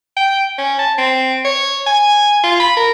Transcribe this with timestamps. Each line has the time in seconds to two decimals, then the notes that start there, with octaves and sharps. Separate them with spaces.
0.17 G5
0.58 C#4
0.79 A5
0.98 C4
1.45 C#5
1.87 G#5
2.44 F4
2.60 B5
2.77 A#4